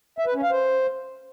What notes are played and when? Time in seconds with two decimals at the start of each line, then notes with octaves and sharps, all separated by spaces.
0.18 E5
0.27 B4
0.35 C#4
0.43 F5
0.51 C5